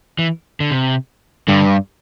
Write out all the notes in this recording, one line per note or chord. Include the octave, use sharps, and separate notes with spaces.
E3
D3
C3
G2 D3